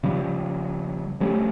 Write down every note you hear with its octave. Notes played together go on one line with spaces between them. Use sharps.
C#3 F3 G3
F3 G3 A3 C#4